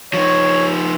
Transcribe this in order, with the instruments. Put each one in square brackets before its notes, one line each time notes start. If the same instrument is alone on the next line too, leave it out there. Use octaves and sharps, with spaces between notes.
[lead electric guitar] F3 D#4 [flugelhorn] C#5